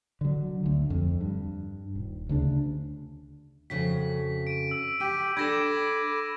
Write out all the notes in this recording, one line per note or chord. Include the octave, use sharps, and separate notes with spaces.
D3 F#3
D2 D3
F2
G2
D#1
D2 C#3 D4
F2 C#3 F#4 B6
D7 D#7
E6
G4 G5 D#7
D4 A4 B5 D6 G#6 A#6 E7